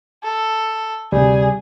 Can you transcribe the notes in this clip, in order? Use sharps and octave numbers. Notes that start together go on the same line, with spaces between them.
A4
D2 C3 G3 G#4